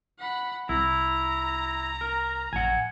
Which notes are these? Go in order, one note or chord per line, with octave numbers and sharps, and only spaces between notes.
F#5 B5
C2 E4 A#5
A#4
A1 F#5 G#5